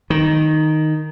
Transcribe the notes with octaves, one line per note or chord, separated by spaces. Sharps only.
D#3